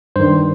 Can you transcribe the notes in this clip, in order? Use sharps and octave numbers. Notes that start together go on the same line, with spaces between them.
G2 D#3 C5